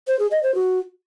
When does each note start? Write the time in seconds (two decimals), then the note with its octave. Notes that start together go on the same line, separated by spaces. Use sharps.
0.07 C5
0.19 G#4
0.31 D#5
0.43 C5
0.55 F#4